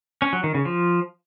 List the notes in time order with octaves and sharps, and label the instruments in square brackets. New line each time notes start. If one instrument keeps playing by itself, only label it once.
[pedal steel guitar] C#4
F#3
D#3
C#3
F3